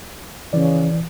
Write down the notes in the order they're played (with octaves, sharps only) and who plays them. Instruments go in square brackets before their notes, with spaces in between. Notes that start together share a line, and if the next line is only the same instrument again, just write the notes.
[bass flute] C#3 [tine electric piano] E3 D5